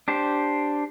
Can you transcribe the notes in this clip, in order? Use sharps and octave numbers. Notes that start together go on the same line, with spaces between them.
D4 G4 C5